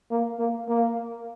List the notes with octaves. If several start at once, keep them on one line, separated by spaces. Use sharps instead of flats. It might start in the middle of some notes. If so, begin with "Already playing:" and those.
A#3
A#3
A#3